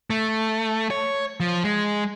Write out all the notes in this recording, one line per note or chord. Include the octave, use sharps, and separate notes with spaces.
A3
C#5
F3
G#3